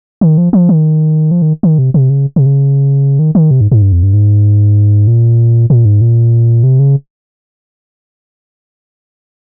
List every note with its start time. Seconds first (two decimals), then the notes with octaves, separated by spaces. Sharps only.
0.21 D#3
0.38 F3
0.53 F3
0.69 D#3
1.31 F3
1.42 D#3
1.63 D#3
1.78 C3
1.94 C3
2.10 C#3
2.36 C3
2.46 C#3
3.19 D#3
3.35 D#3
3.51 C3
3.61 G#2
3.72 G#2
3.82 G2
3.92 F2
4.03 G2
4.13 G#2
5.07 A#2
5.70 A#2
5.85 G#2
6.01 A#2
6.63 C3
6.79 C#3